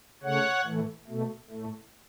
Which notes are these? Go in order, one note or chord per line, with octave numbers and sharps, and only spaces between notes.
C#3 A3 C#5 F#5
A2 E3 A3
B2 A3
A2 A3